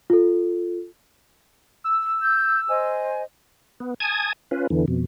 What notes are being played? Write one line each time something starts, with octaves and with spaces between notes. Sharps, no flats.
F4 A4
E6
G6
C5 D#5 G#5
B3
G#5 A5 D#6 G#6
C#4 F4 B4
E2 D3 E3
F2 B2